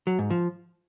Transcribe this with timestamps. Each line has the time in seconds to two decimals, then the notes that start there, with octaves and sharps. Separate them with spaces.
0.07 F#3
0.19 G#2
0.30 F3